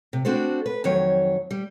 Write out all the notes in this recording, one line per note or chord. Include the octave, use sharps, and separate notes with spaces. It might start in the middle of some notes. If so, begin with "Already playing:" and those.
C3
C4 D4 F#4 A4 C5
B4
F2 D#3 F#3 C#5
G3